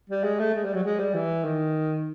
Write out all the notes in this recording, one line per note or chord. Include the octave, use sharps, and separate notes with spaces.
G3
G#3
A3
G#3
G3
F#3
G#3
G3
E3
D#3